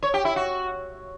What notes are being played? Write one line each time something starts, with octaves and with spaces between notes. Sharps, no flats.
C#5
G4
E4
F#4